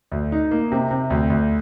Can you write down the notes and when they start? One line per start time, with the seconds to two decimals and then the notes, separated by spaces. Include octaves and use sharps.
0.12 D2
0.32 D#4
0.51 A#3
0.72 C3
0.91 C3
1.10 D2
1.30 D2